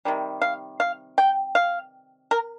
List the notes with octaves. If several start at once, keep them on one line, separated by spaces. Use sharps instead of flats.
C3 D#3 G3
F5
F5
G5
F5
A#4